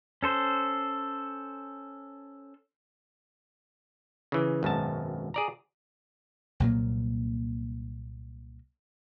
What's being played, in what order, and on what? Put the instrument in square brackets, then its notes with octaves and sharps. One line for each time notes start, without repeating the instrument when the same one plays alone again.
[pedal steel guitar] C#4 A4 C5
[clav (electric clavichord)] C#3 E3
G#1 F#2 B2 A5
G#4 D5 A#5
[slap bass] C2 A#2 F#3 A#3